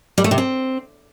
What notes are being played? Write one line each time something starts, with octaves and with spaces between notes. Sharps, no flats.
G3
A3
C3
C4